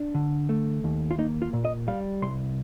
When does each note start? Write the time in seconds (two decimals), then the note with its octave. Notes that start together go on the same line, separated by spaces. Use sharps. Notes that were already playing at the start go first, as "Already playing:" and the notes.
Already playing: D4
0.15 D3
0.49 A3
0.84 D#2
1.11 F4
1.18 A#3 D#4
1.42 F4
1.53 A#2
1.65 D#5
1.88 G3 F5
2.22 C2 C6